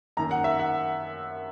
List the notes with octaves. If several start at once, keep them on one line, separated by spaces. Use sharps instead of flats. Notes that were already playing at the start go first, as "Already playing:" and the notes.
F#2 D#3 A#3 A#5
F#5
E5
F#5